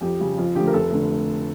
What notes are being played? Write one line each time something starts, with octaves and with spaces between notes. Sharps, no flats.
F2 G4
C#3 G3
F2 F4
D3 F3 A3 G4
A#4
F1 A4
D3 A3